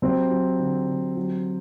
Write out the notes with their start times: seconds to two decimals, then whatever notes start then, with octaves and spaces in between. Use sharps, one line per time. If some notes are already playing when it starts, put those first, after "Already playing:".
0.02 C3 F#3 C4
0.31 F#3
0.59 D3
0.88 D3
1.17 F#3